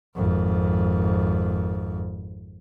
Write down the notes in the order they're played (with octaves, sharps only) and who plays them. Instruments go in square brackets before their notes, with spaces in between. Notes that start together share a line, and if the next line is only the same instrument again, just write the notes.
[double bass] G#1 F2